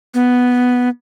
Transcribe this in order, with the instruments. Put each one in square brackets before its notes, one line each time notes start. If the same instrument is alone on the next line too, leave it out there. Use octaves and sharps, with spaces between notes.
[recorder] B3